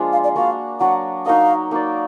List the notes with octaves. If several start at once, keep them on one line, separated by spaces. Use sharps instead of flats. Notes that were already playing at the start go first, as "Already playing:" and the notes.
Already playing: F3 G#3 A#3 D4 F4
F5
D5
A#3 D4 F#4 F5
F#3 D4 F#4 F#5
D#4 F#4 A#4 D#5 F5
A#3 D#4 F#4 D5